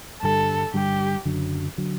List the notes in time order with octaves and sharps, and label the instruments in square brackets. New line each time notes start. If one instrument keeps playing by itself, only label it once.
[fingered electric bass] G2 D3 G3 [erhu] A4
[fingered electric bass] G2 D3 G3 [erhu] G4
[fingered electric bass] F#1 F#2 D3 F#3
D3 F#3